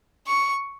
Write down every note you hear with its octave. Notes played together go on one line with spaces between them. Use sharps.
C#6